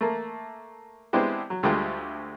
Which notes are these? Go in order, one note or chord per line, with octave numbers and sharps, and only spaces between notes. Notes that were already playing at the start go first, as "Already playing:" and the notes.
A3 A#3
G#3 B3 C4 D4 E4 G4
F#3
D2 G3 G#3 F4 A4 G5